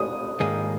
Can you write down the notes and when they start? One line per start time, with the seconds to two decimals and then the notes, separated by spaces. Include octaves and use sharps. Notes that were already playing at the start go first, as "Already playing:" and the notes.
Already playing: D#6
0.40 G#2 D#3 A#3 D#4 G#4